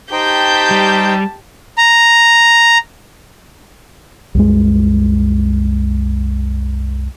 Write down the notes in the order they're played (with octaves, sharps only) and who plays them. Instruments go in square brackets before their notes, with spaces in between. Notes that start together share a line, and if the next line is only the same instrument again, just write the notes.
[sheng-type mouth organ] D#4 C5 G5 [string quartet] G4 G6 [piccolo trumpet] A5
[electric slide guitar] G3
[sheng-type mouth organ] A#5
[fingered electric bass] C2 F#2 G#3